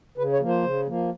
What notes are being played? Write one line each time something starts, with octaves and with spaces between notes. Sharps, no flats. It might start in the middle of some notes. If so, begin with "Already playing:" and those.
C#3 B4
C#5
F3 A#3
C5
C#3
F3 A#3